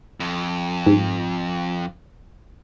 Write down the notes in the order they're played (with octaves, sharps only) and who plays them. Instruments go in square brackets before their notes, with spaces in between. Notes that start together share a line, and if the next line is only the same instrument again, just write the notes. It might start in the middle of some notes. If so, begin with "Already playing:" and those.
[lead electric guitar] F2
[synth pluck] G#2